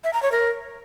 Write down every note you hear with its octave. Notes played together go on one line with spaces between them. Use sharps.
E5
A#5
C#5
A#4